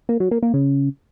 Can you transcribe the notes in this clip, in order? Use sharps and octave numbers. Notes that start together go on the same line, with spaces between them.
A#3
F#3
A#3
A#3
C#3